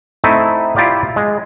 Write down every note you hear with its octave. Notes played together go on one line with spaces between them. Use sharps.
A3 C4 D#4 E4
E4 F4 G4 D5 F5
G#3